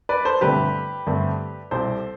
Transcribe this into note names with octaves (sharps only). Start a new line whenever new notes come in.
B4 D5
A4 C5
G1 G2 D3 A3 C4 G4 B4
G2 D3 A3 C4
C2 C3 G3 C4 A4 C5